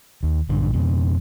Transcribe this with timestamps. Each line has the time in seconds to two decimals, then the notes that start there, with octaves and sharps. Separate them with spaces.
0.23 D#2
0.49 A#1 G2 D3
0.74 F2 B2